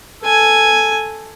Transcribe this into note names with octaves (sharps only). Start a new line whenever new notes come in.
A4 G#5